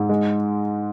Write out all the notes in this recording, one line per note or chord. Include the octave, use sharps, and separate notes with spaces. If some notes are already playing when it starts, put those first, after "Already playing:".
Already playing: G#2 G#4
G#3